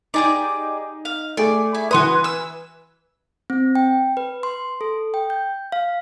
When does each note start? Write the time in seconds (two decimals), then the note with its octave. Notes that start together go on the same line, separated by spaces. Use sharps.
0.14 D#4 G4 G#4 D5
1.05 F5
1.37 A3 G#4 D5 G#5
1.75 E4
1.91 E3 F#4 B4 C6 D#6
2.24 E6
3.50 C4
3.75 G5
4.17 B4
4.43 C6
4.81 A4
5.14 G5
5.30 G6
5.72 F5